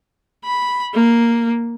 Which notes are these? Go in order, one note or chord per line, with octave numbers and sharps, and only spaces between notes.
B5
A#3